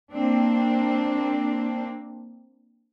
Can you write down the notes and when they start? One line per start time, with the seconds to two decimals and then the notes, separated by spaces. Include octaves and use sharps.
0.12 A#3 C4 D4